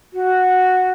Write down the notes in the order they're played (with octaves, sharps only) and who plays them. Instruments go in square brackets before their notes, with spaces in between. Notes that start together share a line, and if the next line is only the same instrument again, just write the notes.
[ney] F#4